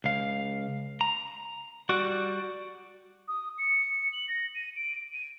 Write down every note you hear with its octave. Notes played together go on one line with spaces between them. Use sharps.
C#2 F5
A#5
G3 F#4 D5 F#5
D#6
C#7
F#7
A#6
D#7
D7
D#7